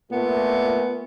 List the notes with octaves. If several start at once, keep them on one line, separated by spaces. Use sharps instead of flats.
A#2 A3 B3